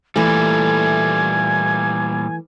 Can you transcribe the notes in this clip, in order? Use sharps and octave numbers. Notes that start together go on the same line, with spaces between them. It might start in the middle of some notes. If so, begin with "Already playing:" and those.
A#2 E3 G3 A3 G#5